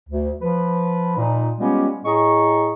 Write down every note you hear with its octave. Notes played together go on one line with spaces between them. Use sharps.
D2
F3 B4
A#2 D#4
G3 G#3 B3 C#4 F4 G4
A2 G#4 D#5 A#5 C#6